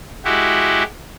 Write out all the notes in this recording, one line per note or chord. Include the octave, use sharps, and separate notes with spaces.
G#3 E4 F#4 G4